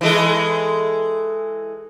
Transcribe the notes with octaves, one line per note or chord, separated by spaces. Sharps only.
E3 G#3 A4